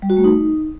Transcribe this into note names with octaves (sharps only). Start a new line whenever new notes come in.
G3
F#4
A3
D#4